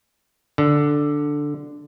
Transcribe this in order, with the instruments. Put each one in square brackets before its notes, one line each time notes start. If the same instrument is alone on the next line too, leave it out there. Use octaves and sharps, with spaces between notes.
[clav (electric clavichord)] D3